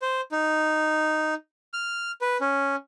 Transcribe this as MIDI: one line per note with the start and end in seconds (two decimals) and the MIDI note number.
0.02 0.21 72
0.32 1.34 63
1.73 2.12 89
2.21 2.37 71
2.41 2.76 61